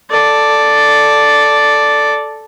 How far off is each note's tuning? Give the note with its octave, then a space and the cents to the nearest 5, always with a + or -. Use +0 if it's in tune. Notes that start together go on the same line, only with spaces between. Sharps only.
A4 +0 D5 +0